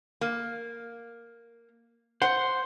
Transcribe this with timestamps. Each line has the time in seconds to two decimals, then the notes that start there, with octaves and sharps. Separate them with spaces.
0.21 A#3
2.22 C5 F#5